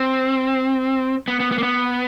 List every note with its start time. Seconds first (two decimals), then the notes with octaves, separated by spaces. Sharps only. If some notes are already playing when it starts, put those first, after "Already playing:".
Already playing: C4
1.28 B3
1.40 B3
1.52 B3
1.58 A#3
1.63 B3